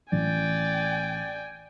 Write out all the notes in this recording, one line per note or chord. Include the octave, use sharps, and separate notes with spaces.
A1 D5 G5 G#5